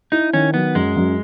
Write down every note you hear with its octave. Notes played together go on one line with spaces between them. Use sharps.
D#4 E4
D#3 C#4
F#3 B3
F#2 G#3
F#2